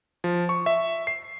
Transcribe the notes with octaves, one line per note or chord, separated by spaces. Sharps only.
F3
C#6
E5
C7